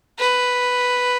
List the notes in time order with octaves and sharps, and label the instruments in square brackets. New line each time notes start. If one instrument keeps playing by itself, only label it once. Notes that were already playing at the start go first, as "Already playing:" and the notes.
[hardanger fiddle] B4